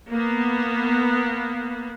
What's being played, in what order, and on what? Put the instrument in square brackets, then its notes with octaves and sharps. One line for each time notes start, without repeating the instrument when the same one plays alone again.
[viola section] A#3 B3